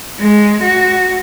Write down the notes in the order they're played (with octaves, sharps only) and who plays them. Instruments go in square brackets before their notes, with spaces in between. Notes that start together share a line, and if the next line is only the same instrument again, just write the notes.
[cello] G#3
F#4